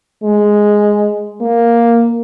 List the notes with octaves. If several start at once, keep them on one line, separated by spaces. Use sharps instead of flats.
G#3
A#3